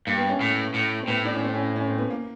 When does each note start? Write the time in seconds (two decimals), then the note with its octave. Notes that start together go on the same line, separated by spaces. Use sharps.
0.07 G2 A#3
0.18 B3
0.29 C#4
0.41 A2
0.74 A2
1.03 C4
1.08 A2 B3
1.25 D4
1.35 C#4
1.44 C4
1.54 C#4
1.76 C#4
1.88 C4
1.98 B3
2.10 A#3